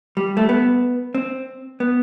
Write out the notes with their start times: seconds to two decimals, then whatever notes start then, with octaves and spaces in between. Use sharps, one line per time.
0.17 G3
0.37 A3
0.49 B3
1.15 C4
1.80 B3